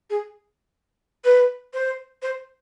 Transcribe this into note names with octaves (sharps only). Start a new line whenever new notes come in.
G#4
B4
C5
C5